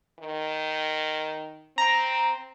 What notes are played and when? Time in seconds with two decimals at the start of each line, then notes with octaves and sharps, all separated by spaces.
0.19 D#3
1.78 C4 A#5